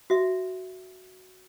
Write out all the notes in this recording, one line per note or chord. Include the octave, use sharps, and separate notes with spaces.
F#4 E5